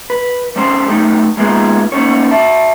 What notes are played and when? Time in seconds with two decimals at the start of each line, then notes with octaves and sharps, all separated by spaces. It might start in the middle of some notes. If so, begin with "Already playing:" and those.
0.10 B4
0.56 G3 C4 C#4 A4 C5
0.88 B1 E2 A3 D#4 G4
1.37 G#3 A#3 B3 D#4 F4 G#4
1.92 A#3 B3 C#4 D#4 C5 C#5
2.31 D5 E5 A5